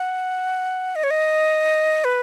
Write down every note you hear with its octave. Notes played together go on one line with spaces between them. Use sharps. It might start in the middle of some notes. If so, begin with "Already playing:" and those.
Already playing: F#5
D#5
C#5
D#5
B4